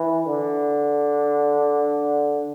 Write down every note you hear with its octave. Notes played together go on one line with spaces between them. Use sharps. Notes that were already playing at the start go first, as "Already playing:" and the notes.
Already playing: E3
D3